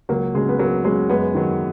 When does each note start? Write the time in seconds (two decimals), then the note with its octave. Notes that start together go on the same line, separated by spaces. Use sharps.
0.09 C#2 F#3 A#3
0.35 C#3 F#3 G#3
0.49 B3
0.59 C#2 F#3 A#3
0.84 C#3 F#3 G#3
1.09 F#2 G#3 B3
1.34 D#3 F#3